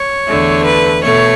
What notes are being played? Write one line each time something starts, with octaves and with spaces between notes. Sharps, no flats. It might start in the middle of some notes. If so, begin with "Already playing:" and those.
Already playing: C#5
E2 D3 A3
B4
B2 A3 C#5